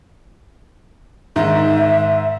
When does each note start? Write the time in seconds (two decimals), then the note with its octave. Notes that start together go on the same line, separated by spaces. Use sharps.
1.36 G#2 D#3 E5